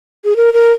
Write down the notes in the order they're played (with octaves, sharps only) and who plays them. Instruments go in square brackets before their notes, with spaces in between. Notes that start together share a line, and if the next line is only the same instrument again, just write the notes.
[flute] G#4
A#4
A#4